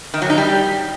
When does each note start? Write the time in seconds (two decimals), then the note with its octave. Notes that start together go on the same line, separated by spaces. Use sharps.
0.14 D#3
0.22 F#3
0.30 D#4
0.38 G3